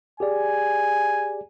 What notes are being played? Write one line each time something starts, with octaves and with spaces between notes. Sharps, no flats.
G4 G#4 D5 G#5